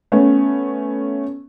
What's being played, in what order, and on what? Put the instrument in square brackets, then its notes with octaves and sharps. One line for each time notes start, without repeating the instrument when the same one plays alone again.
[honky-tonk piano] A3 B3 C#4